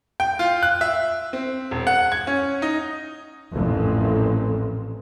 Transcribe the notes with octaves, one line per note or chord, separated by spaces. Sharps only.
G5
F4
F#6
E5
C4
E1
F#5
G#6
C#4
D#4
A1 F2 A#2